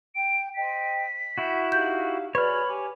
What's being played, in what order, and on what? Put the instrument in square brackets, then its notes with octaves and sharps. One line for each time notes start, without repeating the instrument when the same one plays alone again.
[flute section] G5 [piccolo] D7
[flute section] C5 D#5 G5 [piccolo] B6
[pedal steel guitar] E4 F#4 [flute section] G6
[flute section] D#4 G4 F5 [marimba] G6
[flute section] F#4 G#4 D5 [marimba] B4 [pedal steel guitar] C#5 F6 [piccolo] B5
[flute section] G4 G#5 D6